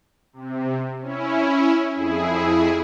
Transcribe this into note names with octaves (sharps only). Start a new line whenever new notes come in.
C3
C#4 E4
F2 E4 G#4